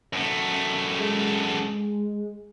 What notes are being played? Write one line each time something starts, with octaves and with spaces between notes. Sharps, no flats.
F#2 A3
G#3